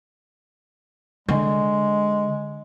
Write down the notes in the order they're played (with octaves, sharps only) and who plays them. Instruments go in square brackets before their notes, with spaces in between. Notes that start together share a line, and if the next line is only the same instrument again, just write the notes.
[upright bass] D3 [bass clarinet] G#3